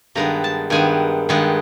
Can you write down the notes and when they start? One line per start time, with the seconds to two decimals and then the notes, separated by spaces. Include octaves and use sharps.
0.15 G2 D#3 G#3 B3 A#5
0.44 A5
0.70 G2 D#3 G#3 B3 G#5
1.29 G2 D#3 G#3 B3